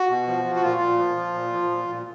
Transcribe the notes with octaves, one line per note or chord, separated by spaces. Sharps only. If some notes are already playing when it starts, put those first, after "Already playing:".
Already playing: F#4
B2
F3
F3
F#4
A#2 F4
A#2
F3
F3
A#2
F3
A#2
A#2